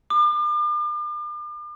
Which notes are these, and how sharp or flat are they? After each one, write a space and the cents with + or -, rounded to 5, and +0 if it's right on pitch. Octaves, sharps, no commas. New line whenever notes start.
D6 +40